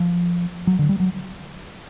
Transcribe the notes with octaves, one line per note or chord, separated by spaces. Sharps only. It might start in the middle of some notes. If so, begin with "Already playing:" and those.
Already playing: F3
F#3
D3
G3
F#3